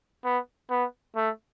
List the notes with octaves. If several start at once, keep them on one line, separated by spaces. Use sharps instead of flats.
B3
B3
A3